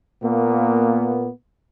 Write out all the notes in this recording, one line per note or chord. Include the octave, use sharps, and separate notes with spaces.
A#2 A#3 B3